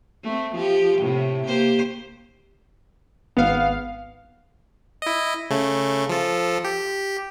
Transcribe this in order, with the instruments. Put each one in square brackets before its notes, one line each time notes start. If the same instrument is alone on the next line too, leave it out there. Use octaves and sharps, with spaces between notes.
[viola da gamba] A3 C4
F3 G4
A2 C3
A#3 G4 C5
[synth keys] G#1 F5 [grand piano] B3
[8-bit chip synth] E4 D#5
C#3 A3
F3 A4
G4